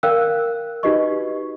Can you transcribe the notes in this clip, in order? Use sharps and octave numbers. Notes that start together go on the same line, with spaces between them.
A#4 D5 F5 G5 E6 F#6
D#4 F#4 G4 B4 D#5 C#6